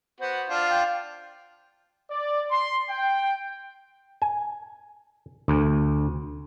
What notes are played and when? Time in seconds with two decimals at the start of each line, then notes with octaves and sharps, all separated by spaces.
0.21 B3 F#4 C5
0.50 D4 F4 F5
0.70 G5
2.10 D5
2.51 C6
2.90 G5
4.22 G#5
5.48 D2